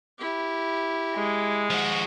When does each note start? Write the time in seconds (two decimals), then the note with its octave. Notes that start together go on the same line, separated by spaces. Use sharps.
0.18 E4 G4
1.15 G#3
1.70 F3 F#4